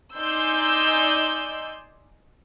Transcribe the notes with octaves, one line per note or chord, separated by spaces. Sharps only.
D#4 D5 G#5 C6 E6 G6